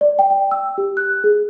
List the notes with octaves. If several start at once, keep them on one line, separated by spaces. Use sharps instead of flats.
D5
G5
G5
E6
G4
F#6
G#4